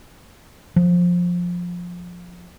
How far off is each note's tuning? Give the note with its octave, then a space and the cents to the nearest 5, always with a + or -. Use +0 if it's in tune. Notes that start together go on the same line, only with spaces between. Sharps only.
F3 +15